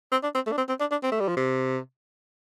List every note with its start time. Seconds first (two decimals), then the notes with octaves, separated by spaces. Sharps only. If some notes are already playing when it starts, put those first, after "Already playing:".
0.12 C4
0.23 D4
0.35 C4
0.47 A3
0.52 D4
0.58 C4
0.69 C4
0.80 D4
0.91 D4
1.03 C4
1.12 A3
1.20 G3
1.28 F3
1.37 C3